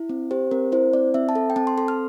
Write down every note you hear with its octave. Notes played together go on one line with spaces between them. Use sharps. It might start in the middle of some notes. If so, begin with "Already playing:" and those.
Already playing: E4
C4
G4 C5
C4 A#4
E4 C5
C4 D5
C4 E5
A5
A4
G5
C4 A5
C6
A4 C6
F6